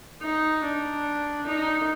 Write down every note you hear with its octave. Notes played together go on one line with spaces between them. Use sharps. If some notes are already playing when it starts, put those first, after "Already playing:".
D#4
D4
D#4